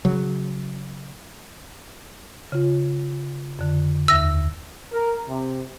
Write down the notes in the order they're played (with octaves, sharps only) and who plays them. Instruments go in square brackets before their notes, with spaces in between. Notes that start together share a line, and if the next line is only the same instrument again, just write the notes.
[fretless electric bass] C#3 F#3
[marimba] C#3 F4
F2 D3
[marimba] D#2 E5 [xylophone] E6 A#6
[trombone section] A#4
C3